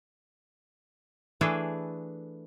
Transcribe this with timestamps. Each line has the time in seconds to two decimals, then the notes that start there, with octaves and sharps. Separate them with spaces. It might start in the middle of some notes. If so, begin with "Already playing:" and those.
1.41 E3 A3 D4 G#4 A4 B4